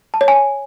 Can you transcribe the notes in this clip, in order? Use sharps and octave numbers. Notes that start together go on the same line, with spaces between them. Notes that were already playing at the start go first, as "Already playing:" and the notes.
A5
C#5
G#5